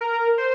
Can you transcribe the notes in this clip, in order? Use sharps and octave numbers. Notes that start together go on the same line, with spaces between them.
A#4
C5